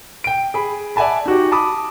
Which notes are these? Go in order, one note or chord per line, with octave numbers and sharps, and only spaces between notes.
G5 D7
G#4 B5
D5 E5 F#5 G#5 A5 B5
D#4 F#4 G4
A5 B5 D6 D#6